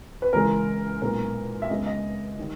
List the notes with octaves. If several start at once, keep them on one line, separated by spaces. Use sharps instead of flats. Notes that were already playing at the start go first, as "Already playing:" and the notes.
B4
C#2 C#3 E3 G#3 A#4
B1 A#2 G#3 B3 A#4
E5
C#2 C#3 G#3 B3 D#5
D#5
D#3 G3